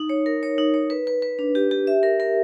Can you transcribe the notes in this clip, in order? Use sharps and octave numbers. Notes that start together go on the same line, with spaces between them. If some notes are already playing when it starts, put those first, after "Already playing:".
Already playing: D#4
C#5
A#4
C#5
D#4
C#5
B4
B4
B4
D4
G4
G4
E5
A#4
A#4